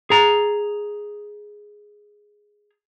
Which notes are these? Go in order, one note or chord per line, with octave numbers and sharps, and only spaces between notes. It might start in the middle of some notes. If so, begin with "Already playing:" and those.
G#4 A#5